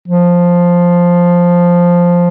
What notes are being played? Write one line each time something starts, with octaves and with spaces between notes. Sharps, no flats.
F3